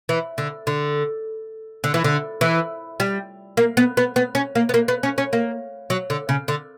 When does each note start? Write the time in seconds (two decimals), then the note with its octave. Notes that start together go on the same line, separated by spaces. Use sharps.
0.09 E3
0.38 D3
0.67 D3
1.84 D3
1.94 E3
2.04 D3
2.41 E3
3.00 G3
3.57 A#3
3.77 B3
3.97 B3
4.16 B3
4.35 C#4
4.55 A#3
4.69 B3
4.74 A#3
4.88 B3
5.03 C#4
5.18 C#4
5.33 A#3
5.90 F#3
6.10 D3
6.29 C#3
6.48 D3